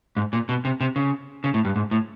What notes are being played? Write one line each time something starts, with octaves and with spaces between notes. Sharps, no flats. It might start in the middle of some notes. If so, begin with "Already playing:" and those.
G#2
A#2
B2
C3
C3
C#3
C#3
A2
G2
G#2
A2